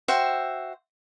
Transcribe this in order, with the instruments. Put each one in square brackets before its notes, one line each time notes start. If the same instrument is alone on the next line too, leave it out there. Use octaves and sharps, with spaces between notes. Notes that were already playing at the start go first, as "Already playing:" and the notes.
[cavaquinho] F#4 C5 E5 G5